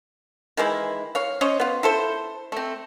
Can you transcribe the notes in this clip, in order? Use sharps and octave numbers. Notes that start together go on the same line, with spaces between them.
D#3 E3 G#3 E4
C#5 F5
C#4 C5 C#5 D#5
B3 F4
E4 A4 C5
A3 C4